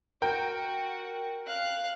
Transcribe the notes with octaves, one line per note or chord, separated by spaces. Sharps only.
F#4 A#4 G5
F5 F#6